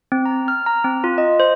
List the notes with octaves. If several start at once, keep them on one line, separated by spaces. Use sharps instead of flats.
C4
A#5
F6
A#5
C4
F4
D#5
C5